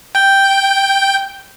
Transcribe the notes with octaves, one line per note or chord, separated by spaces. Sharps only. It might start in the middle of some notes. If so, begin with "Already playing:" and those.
G5 G6